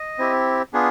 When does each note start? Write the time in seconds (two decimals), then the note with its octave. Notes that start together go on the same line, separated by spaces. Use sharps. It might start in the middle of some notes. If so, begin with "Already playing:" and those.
Already playing: D#5
0.19 C4 E4 G4
0.73 B3 D4 F4 G#4